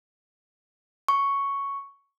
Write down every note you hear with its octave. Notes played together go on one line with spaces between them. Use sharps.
C#6